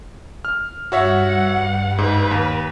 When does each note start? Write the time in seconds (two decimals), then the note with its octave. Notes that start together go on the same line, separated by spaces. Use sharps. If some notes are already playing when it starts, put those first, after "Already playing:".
0.45 F6
0.92 G2 F#4 C#5 E5 F#5
1.98 G#2 B4
2.31 D#2